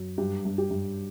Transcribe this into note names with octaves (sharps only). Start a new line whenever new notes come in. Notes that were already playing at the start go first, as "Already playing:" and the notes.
Already playing: F#2
G2 G4
G2
G4
G2